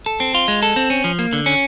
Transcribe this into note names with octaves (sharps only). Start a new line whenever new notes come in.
A4
C4
F4
G#3
A4
C4
C#4
F3
A#3
D3
C#4